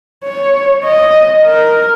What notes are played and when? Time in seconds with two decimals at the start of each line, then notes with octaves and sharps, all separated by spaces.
0.24 C#5
0.84 D#5
1.44 A#4